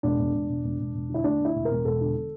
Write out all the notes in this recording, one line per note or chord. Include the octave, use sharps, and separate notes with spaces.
E1 D4
E1
E1
E1
E1
E1
E1
D3 E4
D2 D4
D2 E4
E1
A#4
E1
E1 A4
D3
D3